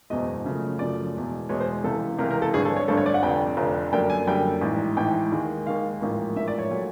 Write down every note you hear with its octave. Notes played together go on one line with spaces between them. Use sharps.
F#1 E2 B2 G#3 D#5
F#2 C#3 F3 A3
F#2 C#3 F3 A3 D5
E2 B2 G#3
E2 B2 G#3 C#5
C5
C#2 C3 E3 A4
C#2 C3 E3 A#4
A#4
A4
G#1 G2 D3 G#4
A4
C#5
G#1 G2 D3 A4
C#5
D5
F#5
F1 F2 D3 G5
F1 F2 D3
F#2 D3 G3 A#3 G5
G#5
F#2 D3 G3 A#3 G5
A1 G#2 E3
A1 G#2 E3 G5
D#2 D#3 G#3
D#2 D#3 G#3 F5
A1 G#2 F3 A#3
A1 G#2 F3 A#3 E5
D5
C#5
A#2 F#3 A3